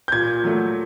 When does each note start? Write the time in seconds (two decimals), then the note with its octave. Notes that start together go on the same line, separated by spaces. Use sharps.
0.08 G6
0.12 A#2 G#6
0.44 F#3 A3